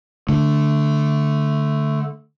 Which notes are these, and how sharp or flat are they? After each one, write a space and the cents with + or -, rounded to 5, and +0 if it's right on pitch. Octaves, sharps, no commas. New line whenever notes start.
D3 +0 A3 +0